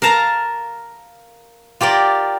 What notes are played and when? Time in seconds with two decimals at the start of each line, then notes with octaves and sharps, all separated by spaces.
0.02 A#4 F5 A5 A#5
1.81 F4 G4 A#4 D5